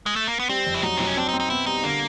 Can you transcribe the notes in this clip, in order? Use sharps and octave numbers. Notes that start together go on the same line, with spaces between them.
G#3
A3
A#3
B3
G3 C4
F2
E4
F#3 D#4
F#3 C4
C#4
C4 D4
D#4
C4
D#4
B2 E4
G3 D#4
D3 A#3